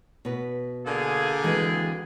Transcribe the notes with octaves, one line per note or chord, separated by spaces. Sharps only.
B2 B4
D3 A#3 G#4
E3 G#3 C4 F#4 B4